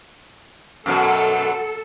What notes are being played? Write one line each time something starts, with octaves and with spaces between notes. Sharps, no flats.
F#2 B2 F#3 A4